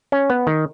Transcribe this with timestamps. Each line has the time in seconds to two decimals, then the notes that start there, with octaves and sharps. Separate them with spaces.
0.12 C#4
0.30 B3
0.47 D#3